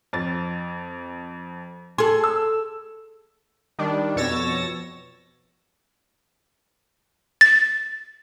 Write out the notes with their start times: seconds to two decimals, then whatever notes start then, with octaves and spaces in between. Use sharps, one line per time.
0.13 F2 A6
1.98 G#4 A4 C6
2.24 E6
3.79 D#3 G3 D4
4.16 F2 B2 C#5 E6 A6 A#6
7.41 A6